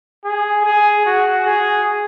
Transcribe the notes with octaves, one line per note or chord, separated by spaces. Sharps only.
G#4
G#4
F#4
G#4